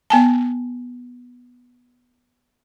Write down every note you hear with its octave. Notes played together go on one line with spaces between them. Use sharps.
B3 G#5 A5